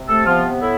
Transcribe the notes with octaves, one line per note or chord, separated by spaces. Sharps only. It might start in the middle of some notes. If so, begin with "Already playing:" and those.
Already playing: C3
A3 A4
F3 B3 F4
A2 E4